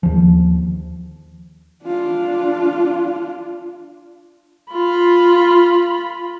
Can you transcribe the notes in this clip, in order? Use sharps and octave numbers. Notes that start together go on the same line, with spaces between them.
D#2 F3
D4 F4
F4 B5